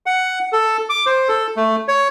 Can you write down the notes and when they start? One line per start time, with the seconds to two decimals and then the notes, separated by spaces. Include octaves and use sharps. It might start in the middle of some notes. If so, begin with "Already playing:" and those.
0.06 F#5
0.52 A4
0.89 D6
1.06 C5
1.28 A4
1.57 A3
1.88 C#5